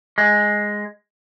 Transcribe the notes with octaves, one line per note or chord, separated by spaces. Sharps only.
G#3